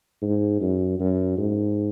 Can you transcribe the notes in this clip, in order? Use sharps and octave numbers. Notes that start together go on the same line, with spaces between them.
G#2
F#2
F#2
G#2